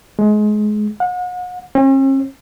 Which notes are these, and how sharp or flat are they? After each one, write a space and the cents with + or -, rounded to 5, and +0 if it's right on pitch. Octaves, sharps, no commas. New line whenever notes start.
G#3 +25
F#5 -40
C#4 -45